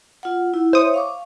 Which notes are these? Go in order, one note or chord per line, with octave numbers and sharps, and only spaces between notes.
F4 F#5
E4
C5 C#5 E5 D#6
F5 C#6 D6